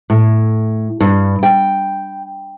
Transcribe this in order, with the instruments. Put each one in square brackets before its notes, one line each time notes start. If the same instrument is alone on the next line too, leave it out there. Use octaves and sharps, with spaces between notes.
[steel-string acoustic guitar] A2
G2
G5